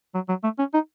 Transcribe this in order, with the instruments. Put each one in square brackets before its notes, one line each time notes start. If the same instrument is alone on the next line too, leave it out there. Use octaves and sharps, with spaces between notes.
[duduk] F#3
F#3
A3
C#4
D#4